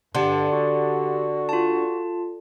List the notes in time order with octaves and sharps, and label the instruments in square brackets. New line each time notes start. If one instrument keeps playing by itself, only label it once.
[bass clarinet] G2 [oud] D3 [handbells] G4 F#5 C6
[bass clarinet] F#4
[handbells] F4 A5